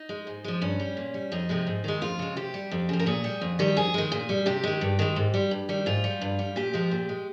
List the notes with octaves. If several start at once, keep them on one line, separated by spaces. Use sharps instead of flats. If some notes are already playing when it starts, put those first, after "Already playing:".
Already playing: D#4
G#3
G#2
F3 G#3
G2 C#4
G3
A#2
G3
F2 D#4
C3 F3 G#3
G#2
D#3 G#3
F2 F4
C#3 G#3
C3 G4
G3
F2
C#3 F3
A#4
A#2 G#4
G3
F2
D#3 G3
F2 G#4
D#3 G#3
A#2
G3
C3 G4
D#3 G#3
G2
D#3 G#3
G#2
G3
G2
D#3 G3
G#2 F4
G3
G2
G3
A#2 G4
F3 G#3
A#2
G#3